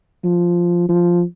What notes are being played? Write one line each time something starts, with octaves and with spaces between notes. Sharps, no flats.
F3
F3